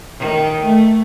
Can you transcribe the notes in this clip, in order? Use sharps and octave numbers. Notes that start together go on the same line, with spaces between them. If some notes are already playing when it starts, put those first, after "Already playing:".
D#3
A3